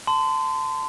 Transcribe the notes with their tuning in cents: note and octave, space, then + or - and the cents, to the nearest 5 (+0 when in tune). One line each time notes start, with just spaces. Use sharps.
A5 +10 C6 -30